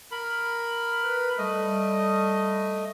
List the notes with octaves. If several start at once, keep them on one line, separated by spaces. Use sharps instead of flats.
A#4 B5
B4
G3 A3 D#5